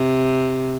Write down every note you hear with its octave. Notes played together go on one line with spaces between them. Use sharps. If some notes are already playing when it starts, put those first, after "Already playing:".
Already playing: C3